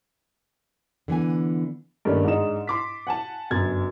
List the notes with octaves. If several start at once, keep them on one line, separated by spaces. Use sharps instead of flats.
D3 E3 B3 G#5
G2 D#3 A3 A#3 C#4 D4
G#2 G#3 D4 D#4 E7
C6 D6 B6
F#5 G#5 A5
G1 F#2 G#6 A6